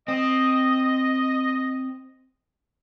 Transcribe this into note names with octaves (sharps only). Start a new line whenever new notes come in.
C4 D#5